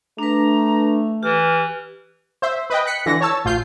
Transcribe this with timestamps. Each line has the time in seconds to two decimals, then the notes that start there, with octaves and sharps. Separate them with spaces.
0.19 A3 D4 B4 A#5
1.23 E3 G4 F6
2.42 C5 E5
2.70 B4 D#5 G5
2.86 F#6 B6 C#7
3.06 D3 E3 A#6
3.21 C#5 A5 E6
3.45 A1 F4 G6 C7